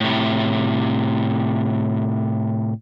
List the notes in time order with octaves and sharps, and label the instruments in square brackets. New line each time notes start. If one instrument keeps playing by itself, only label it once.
[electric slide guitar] A2 C3